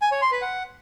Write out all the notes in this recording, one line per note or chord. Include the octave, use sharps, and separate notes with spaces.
G#5
C#5
C6
B4
F#5